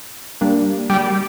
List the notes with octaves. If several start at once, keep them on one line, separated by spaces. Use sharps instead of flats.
G3 A#3 D4
G3